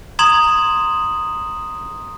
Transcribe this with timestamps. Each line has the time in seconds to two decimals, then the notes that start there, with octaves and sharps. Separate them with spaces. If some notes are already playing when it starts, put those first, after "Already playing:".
0.19 A#5 C6 D#6 G#6 E7 F#7